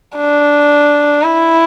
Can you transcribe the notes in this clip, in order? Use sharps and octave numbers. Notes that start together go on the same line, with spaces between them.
D4
E4